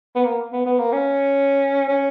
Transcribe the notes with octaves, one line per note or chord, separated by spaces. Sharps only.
B3
A#3
B3
B3
A#3
C#4
C#4